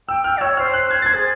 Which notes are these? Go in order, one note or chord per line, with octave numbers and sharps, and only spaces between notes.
G5 E6
G5 F6
D5
C#5 E6
C5 F6
F#6
G#6
A6
G#6
G#4